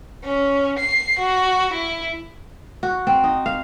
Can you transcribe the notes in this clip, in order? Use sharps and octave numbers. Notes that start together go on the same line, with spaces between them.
C#4
C7
F#4
E4
F#4
C4
D#4
F5